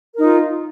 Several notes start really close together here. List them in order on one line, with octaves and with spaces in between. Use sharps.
A#4 D#4 F4